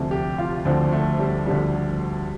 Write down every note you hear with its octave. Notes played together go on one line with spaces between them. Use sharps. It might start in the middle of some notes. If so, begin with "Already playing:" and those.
Already playing: D2 C3 F3
G4
F4
D2 D3 F3 C4
A3
G3
D2 D3 F3 G3